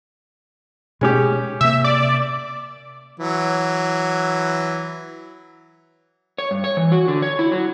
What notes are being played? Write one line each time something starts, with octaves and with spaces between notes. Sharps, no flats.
B2 G#3 C#4 G4
C3 A#3 E5
D5
E3 F#3
C#5
G2
C#5
E3
F#4
D3
C#5
E4
F#3